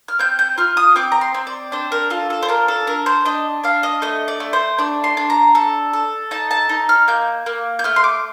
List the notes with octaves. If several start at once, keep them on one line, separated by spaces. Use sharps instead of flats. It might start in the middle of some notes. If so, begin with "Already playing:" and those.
F6
C4 G6
G6
F4 F6
D#6
C4 D6
A#5
C6
C4
D5
D4 C5
A#4
F4 A4
A4
C5
D4 A#4
A4
D4 A#4
C5
D4 D#5
D4 F5
D#5
A3 D#5
D5
A3
C5
D4 D5
C6
D4
A#5
A4
A4
D#4 A5
A5
D#4
F6
A#3 G6
A#3
G6
A3 F6
C6
D6